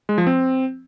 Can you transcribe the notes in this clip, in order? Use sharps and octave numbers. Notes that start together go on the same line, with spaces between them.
G#3
F3
C4